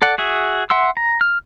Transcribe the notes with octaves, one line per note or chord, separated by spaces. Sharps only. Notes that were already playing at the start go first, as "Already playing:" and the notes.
A4 D5 F#5
F#4 G#4 E5
E5 F#5 C6 E6
A#5
F6